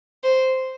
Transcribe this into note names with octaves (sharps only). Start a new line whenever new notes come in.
C5